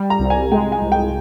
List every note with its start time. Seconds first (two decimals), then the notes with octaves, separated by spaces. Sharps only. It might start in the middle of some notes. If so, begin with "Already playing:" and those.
Already playing: G3
0.10 A#5
0.19 C2
0.30 G#5
0.52 G#3 G5
0.72 G#5
0.82 C2
0.92 G5